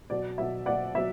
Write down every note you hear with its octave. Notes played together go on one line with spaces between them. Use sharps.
B2 F#3 D5
B2 F#3 E5
B2 F#3 D5 F#5
B2 F#3 E5